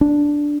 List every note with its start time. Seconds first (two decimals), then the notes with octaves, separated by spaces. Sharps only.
0.01 D4